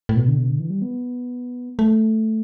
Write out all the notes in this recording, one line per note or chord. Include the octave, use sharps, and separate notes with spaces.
A2
B2
D3
B2
D3
E3
G3
B3
A3